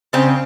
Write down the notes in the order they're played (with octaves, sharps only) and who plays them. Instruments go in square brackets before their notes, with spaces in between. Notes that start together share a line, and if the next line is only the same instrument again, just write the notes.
[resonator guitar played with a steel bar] C#3 C4